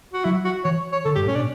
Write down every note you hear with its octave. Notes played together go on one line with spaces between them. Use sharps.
F#4
F#3 E4
F#4
E3 C#5
C#5
D3 A4
G2 G4
A2 C#4
B2 D4